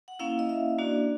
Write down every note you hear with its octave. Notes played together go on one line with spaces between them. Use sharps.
F#5
A#3 C#4 E4 F5
D#5
E5
A#3 D4 F#4 D5